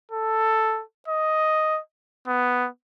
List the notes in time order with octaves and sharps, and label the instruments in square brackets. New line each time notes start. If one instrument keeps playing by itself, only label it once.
[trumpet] A4
D#5
B3